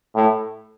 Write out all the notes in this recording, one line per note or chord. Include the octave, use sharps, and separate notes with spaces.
A2